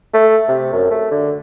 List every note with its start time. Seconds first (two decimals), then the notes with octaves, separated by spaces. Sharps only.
0.14 A3
0.48 C3
0.73 F#2
0.91 A3
1.12 D3